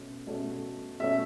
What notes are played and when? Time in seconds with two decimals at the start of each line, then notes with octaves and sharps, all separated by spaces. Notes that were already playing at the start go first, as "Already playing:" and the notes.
Already playing: B2 A3 C#4
0.27 B2 A3 C#4
1.00 B2 A3 C#4 E5